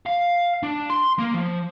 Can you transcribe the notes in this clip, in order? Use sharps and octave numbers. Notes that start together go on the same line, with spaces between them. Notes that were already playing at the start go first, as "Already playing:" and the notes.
F5
D4
C6
A#3
F3